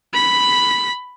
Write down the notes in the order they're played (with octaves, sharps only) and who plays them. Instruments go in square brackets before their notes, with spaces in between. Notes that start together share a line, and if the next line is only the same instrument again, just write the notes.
[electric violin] B5 B6